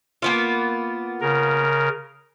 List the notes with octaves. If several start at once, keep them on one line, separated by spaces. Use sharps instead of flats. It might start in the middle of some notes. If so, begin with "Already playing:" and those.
A#3 B3 F4
C#3 A#4